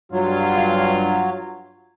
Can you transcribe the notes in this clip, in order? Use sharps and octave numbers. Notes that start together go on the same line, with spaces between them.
G2 F#3 F4